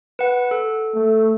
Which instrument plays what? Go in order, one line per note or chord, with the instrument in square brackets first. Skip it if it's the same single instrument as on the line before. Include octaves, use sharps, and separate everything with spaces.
[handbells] B4 F#5
A4
[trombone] A3